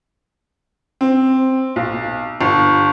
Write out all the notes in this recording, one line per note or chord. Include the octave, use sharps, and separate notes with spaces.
C4
B1
G1